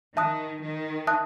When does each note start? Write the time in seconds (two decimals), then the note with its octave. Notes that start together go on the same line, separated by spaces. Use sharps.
0.16 D#3 E5 A5 D#6 F#6
0.61 D#3
1.07 E5 A5 D#6 F#6